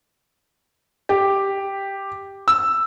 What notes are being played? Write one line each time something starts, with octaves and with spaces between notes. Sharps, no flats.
G4
E6